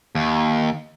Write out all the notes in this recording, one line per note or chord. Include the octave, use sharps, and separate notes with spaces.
D#2